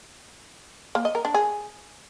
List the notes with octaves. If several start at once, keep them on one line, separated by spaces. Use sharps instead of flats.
A#3
D#5
A#4
D4
G#4